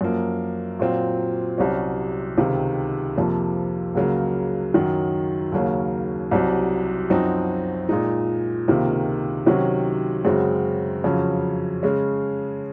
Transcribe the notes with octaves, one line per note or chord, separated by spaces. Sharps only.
F#2 F3 A#3
A#2 F#3 C4 F4
C2 C3 F#3 C#4
C#2 C3 D#3
F2 C3 F3 A#3
C#2 C#3 F#3 A#3
F#2 D#3 F#3
D#2 C#3 F#3 A#3 C#4
C2 C3 F#3
F#2 F3 C4 D#4 F#4
A#2 G#3 D#4
C#2 C3 D#3 A#3 F4
C3 D#3 F#3 C#4 F#4
F#2 C#3 G#3 C4 F#4
F2 C#3 F#3 C#4 F4
C#3 G#3 C#4